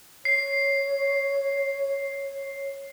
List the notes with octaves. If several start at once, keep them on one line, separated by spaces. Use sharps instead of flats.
C#5 C7